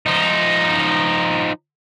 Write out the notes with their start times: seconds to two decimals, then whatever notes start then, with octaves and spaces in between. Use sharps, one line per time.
0.06 F3 D#4